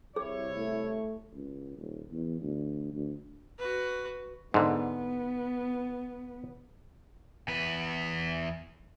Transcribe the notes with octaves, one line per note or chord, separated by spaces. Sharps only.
C2 E4 G#4 C#5
A3
C#2
D#1
E2
D2
D2
F#4 B4
G#2 D3 B3
E2 B4